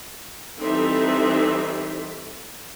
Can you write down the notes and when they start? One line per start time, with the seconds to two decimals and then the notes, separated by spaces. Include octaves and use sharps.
0.59 E3 G3 C4 D#4 A4 E5